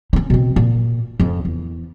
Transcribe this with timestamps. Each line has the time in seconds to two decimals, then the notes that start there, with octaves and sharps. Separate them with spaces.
0.13 C#4 D#4
0.30 B2 C4
0.56 A#2
1.20 F2 C#4
1.45 E2